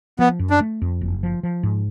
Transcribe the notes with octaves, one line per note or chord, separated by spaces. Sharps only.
F3 B3
F#2
D4
A3
F2
F#1
F3
F3
G#2